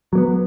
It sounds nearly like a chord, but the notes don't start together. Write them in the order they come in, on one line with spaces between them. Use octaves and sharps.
F#3 A#3 B3